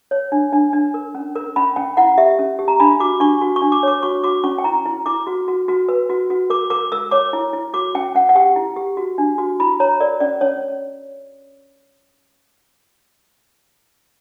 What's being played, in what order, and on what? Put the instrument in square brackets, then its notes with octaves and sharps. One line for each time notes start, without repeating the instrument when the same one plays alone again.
[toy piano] C#5
D4
D4
D4
A#4
C#4
A#4
C#4 B5
C#4 G5
E4 F#5
G4 E5
C#4
G4
A#5
D4 B5
F#4 D6
D4 C#6
F#4
C#6
D4
D6
C#5 D6
F#4 C#6
F#4 D6
C#4 C#6
G5
E4 A#5
E4
E4 D6
F#4
F#4
F#4
B4
F#4
F#4
A#4 D6
A#4 D6
A#4 E6
C#5 D6
E4
E4
F#4 D6
C#4 G5
C#4 F#5
F#5
G4 G5
E4
G4
F#4
D4
F#4
E4 B5
C#5 A#5
A#4 D5
C#4 D5
C#4 C#5